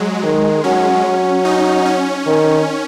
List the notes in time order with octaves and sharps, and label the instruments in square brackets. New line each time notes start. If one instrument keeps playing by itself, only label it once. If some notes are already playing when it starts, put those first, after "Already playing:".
Already playing: [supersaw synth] F#3 G#3
[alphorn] D#3
[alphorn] F#3 [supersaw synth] C#4
[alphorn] F#3
[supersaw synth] D#4
C#4
[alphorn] D#3